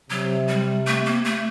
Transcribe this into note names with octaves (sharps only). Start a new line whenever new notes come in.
C3 F#3
G3
A3
A#3
A3